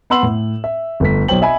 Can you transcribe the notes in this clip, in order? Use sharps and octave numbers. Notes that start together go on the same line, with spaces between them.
B3 F#5 B5 C6 E6 F#7
A2
E5
G1 A3 B6
B1 C5 C#5 G5 F#7
D#5 E5 G#5 B5